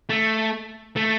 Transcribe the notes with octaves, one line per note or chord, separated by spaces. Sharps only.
A3
A3